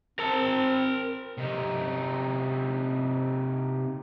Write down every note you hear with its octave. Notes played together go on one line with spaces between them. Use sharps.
C4 A#4 A5
C3 D#4